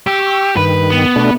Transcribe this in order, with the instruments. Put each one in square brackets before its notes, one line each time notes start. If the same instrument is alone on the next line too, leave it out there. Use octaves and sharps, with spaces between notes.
[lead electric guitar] G4 [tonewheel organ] C#6 E6
[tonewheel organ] G2 D#3 [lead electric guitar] B4
[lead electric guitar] B3
[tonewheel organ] B2 A3 D4